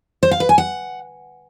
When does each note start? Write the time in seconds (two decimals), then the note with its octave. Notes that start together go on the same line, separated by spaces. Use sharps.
0.23 C5
0.31 F5
0.40 B4
0.49 G#5
0.58 F#5